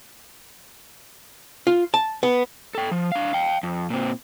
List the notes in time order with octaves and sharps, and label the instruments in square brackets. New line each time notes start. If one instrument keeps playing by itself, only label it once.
[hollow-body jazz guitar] F4
A5
B3
[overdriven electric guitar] A4 G5
F3
D4 F5
F5 G5
F2
A#2 C4